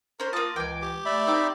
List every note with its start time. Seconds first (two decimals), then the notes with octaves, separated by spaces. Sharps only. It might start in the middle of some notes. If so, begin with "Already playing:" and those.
0.20 C#4 A#4 C5
0.33 A#3 F4 A5 D#6
0.56 C#2 E3 G5 G#5 D6
0.82 G4
1.06 A3 D5 E5 B5
1.27 C4 D#4 G5 D6